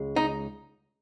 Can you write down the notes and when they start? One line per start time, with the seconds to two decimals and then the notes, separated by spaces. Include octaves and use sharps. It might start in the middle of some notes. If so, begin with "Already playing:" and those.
Already playing: C#2 G#3
0.16 D#4